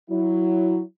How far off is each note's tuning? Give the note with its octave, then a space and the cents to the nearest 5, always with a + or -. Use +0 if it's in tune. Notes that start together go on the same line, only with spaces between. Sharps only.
F#3 +0 E4 +0